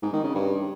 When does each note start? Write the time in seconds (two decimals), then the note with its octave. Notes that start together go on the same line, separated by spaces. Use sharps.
0.02 G#2
0.13 D#3
0.24 C#3
0.35 G2